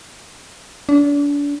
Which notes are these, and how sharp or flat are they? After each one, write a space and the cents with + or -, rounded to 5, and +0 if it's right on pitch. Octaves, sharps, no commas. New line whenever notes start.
D4 -35